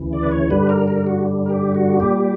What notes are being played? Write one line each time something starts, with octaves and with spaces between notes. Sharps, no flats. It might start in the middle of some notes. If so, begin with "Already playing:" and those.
Already playing: D2 C#3 E3
D5
B4
C#5
G2 D3 G3 B4
A#4
A#4
F#4
A#4
G4
F#4
A#2 G3 G4